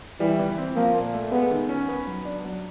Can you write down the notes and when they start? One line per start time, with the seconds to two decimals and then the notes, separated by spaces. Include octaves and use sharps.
0.20 E3 G3
0.39 E3
0.58 C4
0.76 F3 A#3
0.95 A#2
1.14 A3
1.32 G#3 B3
1.51 D#3
1.69 C#4
1.89 B3
2.07 F#3
2.25 D4
2.44 F#3